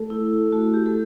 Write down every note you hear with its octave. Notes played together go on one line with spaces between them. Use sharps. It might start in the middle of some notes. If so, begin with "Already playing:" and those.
Already playing: A3 A4
E4
A3 F#4
G4
A4